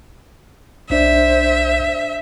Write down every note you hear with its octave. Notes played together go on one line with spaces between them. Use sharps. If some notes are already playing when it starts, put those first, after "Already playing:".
B1 D4 C5 D5 E5